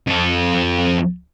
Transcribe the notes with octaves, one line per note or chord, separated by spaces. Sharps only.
F2 A4